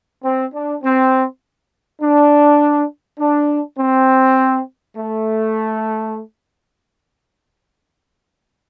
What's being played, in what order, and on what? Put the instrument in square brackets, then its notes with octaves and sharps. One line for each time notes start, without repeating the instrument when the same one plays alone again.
[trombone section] C4
D4
C4
D4
D4
C4
A3